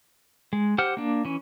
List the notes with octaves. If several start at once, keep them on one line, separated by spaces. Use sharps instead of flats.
G#3
G4 C5 F#5 F6
A#3 D4
E3 C#4